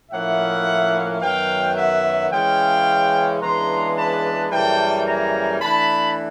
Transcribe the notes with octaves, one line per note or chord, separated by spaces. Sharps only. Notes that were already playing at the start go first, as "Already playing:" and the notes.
A2 F3 A#3 C#4 E4 E5 F#5
F#2 D#3 F#3 B3 F5 G5
E5 F#5
C#3 E3 G#3 C#4 F5 G5
C#3 E3 G#3 B3 D4 A#5 C6
A5 B5
F#2 C#3 E3 G3 A#3 G5 A5
G#5 A#5
E3 A3 D4 A5 B5